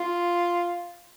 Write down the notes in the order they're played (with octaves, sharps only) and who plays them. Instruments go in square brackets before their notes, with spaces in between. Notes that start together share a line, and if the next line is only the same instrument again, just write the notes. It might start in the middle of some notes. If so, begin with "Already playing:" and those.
Already playing: [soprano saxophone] F4